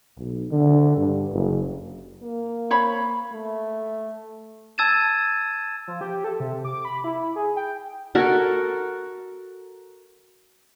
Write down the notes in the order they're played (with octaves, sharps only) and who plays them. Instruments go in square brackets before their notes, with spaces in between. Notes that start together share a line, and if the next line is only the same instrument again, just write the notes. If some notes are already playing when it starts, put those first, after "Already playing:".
[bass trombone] B1
D3
G2
F#1
[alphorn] A#3
[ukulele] C5 C#5 B5
[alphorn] A3
[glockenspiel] A5 E6 G#6 A6 D#7 E7
[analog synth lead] F3
G4
A4
C3
D6
B5
E4
G#4
G5
[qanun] F#4 A4 A#4